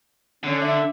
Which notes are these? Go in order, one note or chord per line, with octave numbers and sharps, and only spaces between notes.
D3 C#4
D4 E5